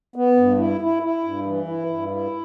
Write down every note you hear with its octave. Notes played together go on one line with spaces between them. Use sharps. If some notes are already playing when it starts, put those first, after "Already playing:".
B3
G2
E4
E4
E4
G2
E3
E4
G2
E4